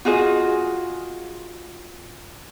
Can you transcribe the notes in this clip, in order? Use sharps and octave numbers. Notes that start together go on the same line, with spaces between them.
F4 F#4 G#4 D#5